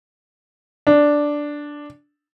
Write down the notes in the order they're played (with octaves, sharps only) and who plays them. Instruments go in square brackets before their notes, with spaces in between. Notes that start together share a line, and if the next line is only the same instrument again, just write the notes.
[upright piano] D4